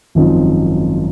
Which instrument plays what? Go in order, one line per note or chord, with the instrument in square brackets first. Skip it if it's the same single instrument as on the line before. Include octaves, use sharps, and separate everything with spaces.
[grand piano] G#1 F#2 F3 C4 D#4